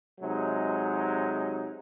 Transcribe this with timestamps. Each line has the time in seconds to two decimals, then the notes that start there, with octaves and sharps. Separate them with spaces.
0.20 C3 F#3 G#3 D#4